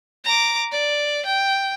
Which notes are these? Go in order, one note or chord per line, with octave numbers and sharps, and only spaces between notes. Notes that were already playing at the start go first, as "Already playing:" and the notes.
A#5 D6
D5
G5